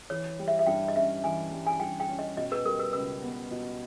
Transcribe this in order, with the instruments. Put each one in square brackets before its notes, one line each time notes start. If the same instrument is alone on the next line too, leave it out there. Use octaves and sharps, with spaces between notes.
[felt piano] E3 [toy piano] C#5
[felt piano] G3
[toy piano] E5
E5
[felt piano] G2 [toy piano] G5
[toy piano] D#5
[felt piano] C#4 [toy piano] E5
[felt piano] E3 [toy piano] G#5
[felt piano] G3
[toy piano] G#5
[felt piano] G2 [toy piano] G5
[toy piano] G5
[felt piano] C#4
[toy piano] D#5
[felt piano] B2 [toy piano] D#5
[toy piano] B4
[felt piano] G3 [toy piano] A#4
[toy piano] B4
[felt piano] C#2 [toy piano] B4
[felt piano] B3
B2